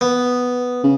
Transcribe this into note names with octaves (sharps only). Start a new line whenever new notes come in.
B3
C#3